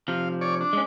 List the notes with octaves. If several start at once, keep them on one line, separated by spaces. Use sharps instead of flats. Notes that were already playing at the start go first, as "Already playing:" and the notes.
C3 F3 F5
C#5 D5
D4
G#3 C#4